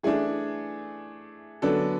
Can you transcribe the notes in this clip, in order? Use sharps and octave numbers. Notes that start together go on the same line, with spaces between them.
E3 A3 D4 G#4
D3 F#3 B3 D4 A4